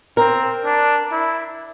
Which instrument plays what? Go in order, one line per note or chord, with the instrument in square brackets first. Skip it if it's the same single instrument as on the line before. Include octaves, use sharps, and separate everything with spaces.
[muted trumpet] C4 [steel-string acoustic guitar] A#4
[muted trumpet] D4
E4